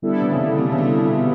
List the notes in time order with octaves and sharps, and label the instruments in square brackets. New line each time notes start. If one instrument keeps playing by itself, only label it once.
[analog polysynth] D3 G3 B3 E4 A4
[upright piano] C3
C#3
C3
C3
C#3
C3
B2